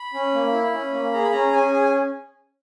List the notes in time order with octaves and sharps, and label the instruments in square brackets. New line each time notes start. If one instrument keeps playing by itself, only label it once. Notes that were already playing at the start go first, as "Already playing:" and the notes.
Already playing: [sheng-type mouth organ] B5
C#4
A#3
E4
C#4
A#3
G#4 A#5
B5
C#4 A#5
C#4 G#5
G#4
G#5